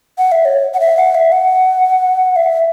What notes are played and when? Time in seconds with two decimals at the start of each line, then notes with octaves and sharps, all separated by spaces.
0.18 F#5
0.32 E5
0.45 C#5
0.74 F#5
0.80 E5
0.97 F#5
1.15 E5
1.32 F#5
2.36 E5